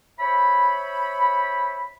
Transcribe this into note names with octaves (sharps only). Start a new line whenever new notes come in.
C5 C#5 E5 B5